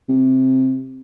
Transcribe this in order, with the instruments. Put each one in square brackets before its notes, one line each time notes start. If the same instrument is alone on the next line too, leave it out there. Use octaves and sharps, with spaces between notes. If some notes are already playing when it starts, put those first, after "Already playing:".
[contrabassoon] C3